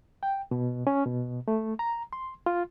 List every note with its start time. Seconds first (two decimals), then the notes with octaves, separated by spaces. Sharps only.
0.23 G5
0.51 B2
0.87 C#4
1.06 B2
1.48 A3
1.79 A#5
2.13 C6
2.46 F4